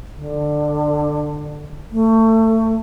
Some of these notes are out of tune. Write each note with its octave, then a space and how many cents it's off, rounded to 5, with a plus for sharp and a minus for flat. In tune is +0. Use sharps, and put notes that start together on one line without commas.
D3 +15
A3 +25